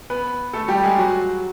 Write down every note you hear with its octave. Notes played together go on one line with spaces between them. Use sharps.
B3 B4
A3 A4
G3 G4
G#3 G#4
F#3 F#4